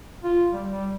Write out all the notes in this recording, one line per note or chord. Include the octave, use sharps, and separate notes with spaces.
F4
G3
G3